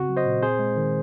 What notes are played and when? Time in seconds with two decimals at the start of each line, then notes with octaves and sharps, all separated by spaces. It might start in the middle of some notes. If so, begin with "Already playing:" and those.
Already playing: C#3 C4 F#4
0.09 F#3
0.17 C5 D#5
0.26 A#2
0.42 C4 G#4 C5
0.59 G#3
0.77 D#3